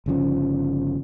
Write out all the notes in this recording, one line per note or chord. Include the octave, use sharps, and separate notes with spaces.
G1 C#3 F3 C#4